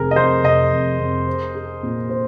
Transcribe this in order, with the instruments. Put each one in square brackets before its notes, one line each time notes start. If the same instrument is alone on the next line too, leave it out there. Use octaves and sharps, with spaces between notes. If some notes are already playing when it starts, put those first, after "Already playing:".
Already playing: [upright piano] F1 C4 [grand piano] G#4 A#4
[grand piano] D#5
[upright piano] F2 [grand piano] C5
[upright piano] F1 [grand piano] D#5
[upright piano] F2
F2
C5
G#4
A#2
C5